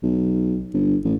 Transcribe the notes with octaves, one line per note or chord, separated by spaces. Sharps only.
B1
G1
A1